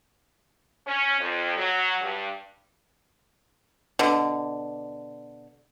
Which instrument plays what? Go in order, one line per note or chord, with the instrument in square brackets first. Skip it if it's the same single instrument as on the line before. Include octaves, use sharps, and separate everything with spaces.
[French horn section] C#4
F2
F#3
G2
[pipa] B2 D3